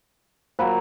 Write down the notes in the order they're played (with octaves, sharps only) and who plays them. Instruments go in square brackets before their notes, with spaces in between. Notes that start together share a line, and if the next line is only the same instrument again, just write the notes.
[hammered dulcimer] A#2 F#3 [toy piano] C5 F5 B5